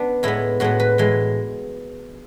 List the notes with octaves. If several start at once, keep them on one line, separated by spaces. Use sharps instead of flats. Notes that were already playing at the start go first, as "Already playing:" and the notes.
Already playing: B3 D4
A2 G#3 B3 E4
A2 G#3 B3 F#4
B4
A2 E3 G#3